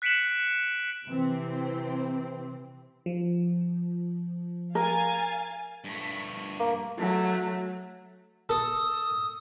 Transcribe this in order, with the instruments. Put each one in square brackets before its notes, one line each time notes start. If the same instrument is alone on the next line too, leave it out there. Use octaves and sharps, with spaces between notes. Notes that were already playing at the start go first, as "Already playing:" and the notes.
[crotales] F#6 B6 C#7 D7 E7 F#7
[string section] C3 E3 C4
[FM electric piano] F3
[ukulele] A#4 [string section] F5 G#5 A6
[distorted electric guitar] G2 A3
[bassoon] A#3
[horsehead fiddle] F#3 A3
[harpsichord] A4 [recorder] D#6